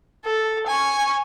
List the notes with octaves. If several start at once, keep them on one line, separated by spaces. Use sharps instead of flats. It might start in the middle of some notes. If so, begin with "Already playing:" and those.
A4
G#5 C#6